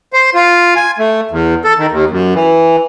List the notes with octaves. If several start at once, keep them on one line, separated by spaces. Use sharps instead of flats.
C5
F4
G#5
A3
E2
A4
D#3
D#2
F#2
E3